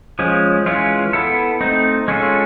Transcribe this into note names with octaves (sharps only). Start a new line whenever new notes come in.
F3 G#3 C#4
E3 G#3 C#4 F4
B3 E4 A4
A3 C4 D#4
G#3 C#4 F4 A4